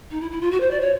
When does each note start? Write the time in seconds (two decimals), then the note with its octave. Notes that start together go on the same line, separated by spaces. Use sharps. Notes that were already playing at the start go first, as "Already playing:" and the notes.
0.11 D#4
0.20 E4
0.31 E4
0.41 F4
0.51 F#4
0.60 C5
0.70 D5
0.80 C#5